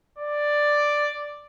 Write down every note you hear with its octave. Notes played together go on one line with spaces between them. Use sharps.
D5